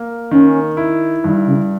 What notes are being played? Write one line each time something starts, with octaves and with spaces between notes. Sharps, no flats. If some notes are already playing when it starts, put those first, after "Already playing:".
Already playing: A#3
D#3 C#4
E4
G2 D#3
C#3